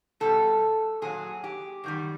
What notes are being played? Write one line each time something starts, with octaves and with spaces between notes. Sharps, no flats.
B2 G3 A4
A#2 F#3 G#4
G4
F#2 D#3 G3